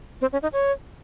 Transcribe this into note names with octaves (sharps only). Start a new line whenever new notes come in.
C4
C#4
D#4
C#5